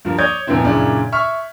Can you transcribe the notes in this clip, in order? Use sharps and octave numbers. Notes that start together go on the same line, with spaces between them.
G2 F3 A#3
C#5 D5 D#6 G6 G#6
F2 A#2 F3 B3 C4 E4
F#2 A#2 C#3 D4 E4
E5 C#6 F6